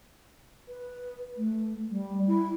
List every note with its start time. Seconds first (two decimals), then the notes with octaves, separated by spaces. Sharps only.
0.68 B4
1.37 A3
1.91 G3
2.27 E4